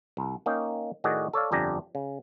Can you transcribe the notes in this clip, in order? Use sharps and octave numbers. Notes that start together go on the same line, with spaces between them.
C2
A#3 C#4 D#4 G5
A2 D#3 F#4 G#4 D5 D#5
A4 C#5 D5 F5
G1 F2 D4 G4 G#5 A#5
C#3